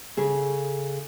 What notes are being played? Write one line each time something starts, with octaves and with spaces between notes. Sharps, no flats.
C#3 G#4 A4